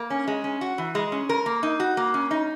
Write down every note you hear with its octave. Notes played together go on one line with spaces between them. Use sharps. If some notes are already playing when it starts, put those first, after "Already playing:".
Already playing: A#3
C#4
G#3
C#4
F#4
E3
G#3
C#4
A#4
A#3
D#4
F#4
A#3
C#4
D#4